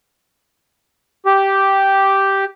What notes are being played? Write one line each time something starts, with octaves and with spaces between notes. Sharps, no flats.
G4